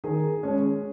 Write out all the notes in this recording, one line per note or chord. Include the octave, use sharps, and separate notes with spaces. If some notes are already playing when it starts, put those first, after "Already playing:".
D#3 G#4
G#3 C#4